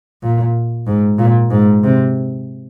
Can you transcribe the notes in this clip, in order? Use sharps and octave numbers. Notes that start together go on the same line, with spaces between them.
A#2
G#2
A#2
G#2
C3